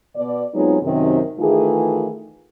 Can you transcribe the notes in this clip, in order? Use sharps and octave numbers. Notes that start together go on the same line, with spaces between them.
B2 D5
F#3 G#3 B3 C4 D#4 F4
F#2 C3 D#3
D#3 E3 A3 F4 G#4